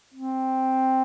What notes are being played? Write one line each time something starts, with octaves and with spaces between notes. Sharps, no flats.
C4